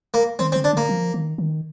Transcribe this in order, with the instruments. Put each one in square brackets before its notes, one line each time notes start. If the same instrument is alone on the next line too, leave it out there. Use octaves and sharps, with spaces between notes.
[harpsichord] A#3
[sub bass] D#3 [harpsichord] C4
[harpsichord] C4
[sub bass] D3
[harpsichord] D4
[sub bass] D3 [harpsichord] A#3
[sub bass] F3
D#3
D#3